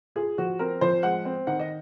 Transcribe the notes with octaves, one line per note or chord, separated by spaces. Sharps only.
F4 G#4
F3 F#4
C4 A#4
F3 C5
G#3 F#5
C4
D#3 F#5
D#5